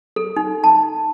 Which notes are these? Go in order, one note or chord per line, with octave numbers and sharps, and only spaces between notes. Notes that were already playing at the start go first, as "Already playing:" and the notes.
A4
D#4
A5